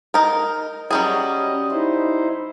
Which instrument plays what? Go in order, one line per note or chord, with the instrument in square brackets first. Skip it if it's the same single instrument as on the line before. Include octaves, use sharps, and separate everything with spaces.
[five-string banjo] D#4 A#4
[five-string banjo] F#3 G3 G#4 [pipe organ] C#4 D#5
[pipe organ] D#4 E4 C5